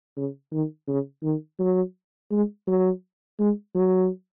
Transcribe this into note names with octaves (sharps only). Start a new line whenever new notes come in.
C#3
D#3
C#3
D#3
F#3
G#3
F#3
G#3
F#3